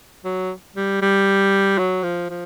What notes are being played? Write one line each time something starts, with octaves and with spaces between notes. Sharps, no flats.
F#3
G3
G3
F#3
F3
F3